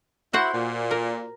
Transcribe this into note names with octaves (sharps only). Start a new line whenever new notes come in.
E4 F#4 C5 F#5
A#2
A#4